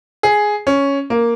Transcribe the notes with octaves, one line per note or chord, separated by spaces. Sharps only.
G#4
C#4
A#3